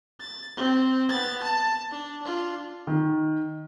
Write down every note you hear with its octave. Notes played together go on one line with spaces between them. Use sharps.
A6
C4
B3 A6
A5
D4
D4 F4
D#3